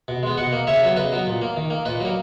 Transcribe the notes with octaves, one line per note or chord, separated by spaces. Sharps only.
B2
G#3 B3
B2 D#5 F#5
A#3
C#3 C#5 E5
F#3 B3
C#3 B4 D#5
F#3 B3
A#2
A#3
D#3
A#3
A#2 B4 D#5
F#3 A#3